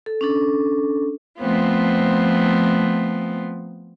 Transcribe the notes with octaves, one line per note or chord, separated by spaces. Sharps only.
A4
C#4 D4 A4
F3 A3 B3 C4 F4